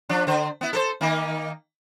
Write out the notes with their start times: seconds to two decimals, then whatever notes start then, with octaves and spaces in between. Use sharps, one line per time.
0.09 F3 D4
0.27 D3 C5
0.61 B3 E4
0.73 A4 A#4 C5
1.01 D#3 A#3 D#4